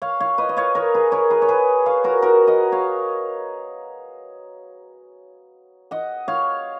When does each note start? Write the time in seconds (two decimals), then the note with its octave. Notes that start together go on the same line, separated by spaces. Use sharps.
0.02 C#5 F5
0.20 C#5 F5
0.38 B4 D#5
0.49 D#5
0.57 C#5 F5
0.75 A#4 C#5
0.94 G#4 B4
1.12 A#4 C#5
1.30 G#4 B4
1.42 C#5
1.49 G#4 B4
1.86 C#5 F5
2.04 F#4 A#4
2.22 F#4 A#4
2.47 D#5 F#5
2.72 C#5 F5
5.91 D#5 F#5
6.28 C#5 F5